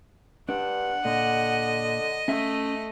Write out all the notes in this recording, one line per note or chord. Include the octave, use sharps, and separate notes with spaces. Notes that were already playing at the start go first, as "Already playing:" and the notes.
G2 D4 F#5
A#2 D3 D#5
A3 C#4 E5